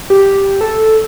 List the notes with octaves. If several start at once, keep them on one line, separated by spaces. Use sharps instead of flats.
G4
A4